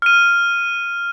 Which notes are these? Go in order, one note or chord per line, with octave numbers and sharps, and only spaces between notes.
F6 D#7